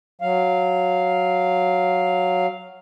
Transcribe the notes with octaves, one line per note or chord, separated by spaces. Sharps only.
F#3 F5